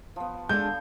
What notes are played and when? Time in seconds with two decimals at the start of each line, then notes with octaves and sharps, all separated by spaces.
0.16 F3 B3
0.49 D3 G#3 D4 A4 G6